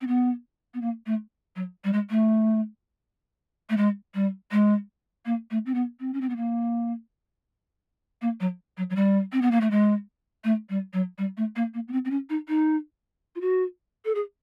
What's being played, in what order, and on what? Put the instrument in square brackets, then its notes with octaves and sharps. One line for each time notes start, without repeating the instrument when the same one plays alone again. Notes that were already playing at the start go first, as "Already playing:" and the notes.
[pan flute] C4
B3
B3
A#3
A3
F#3
G3
G#3
A3
A3
G#3
G3
G#3
A#3
A3
C4
B3
C4
C#4
C4
B3
A#3
A#3
F#3
F#3
F#3
G3
C4
B3
A#3
A3
G#3
A3
G3
F#3
G3
A3
A#3
A#3
B3
C4
C4
C#4
D#4
D#4
F4
F#4
A4
G#4